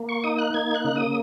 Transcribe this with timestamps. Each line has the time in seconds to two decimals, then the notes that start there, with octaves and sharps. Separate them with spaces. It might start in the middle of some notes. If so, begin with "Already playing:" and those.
Already playing: A#3
0.09 C#6
0.24 D#4 D#6
0.38 F#6
0.54 A#3 G#6
0.75 F#6
0.85 C#3
0.95 D#6